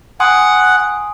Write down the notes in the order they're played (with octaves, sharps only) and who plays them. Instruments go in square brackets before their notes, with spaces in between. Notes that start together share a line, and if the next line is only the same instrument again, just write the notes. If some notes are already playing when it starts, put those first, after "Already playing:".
[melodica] F#5 [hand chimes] G#5 C6 D#6